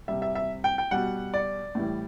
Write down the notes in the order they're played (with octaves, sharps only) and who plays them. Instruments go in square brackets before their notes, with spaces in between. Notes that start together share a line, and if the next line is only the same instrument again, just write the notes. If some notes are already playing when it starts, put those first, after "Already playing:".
[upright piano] C3 G3 E5
E5
E5
G5
G5
B2 G3 F#5
D5
A2 E3 G3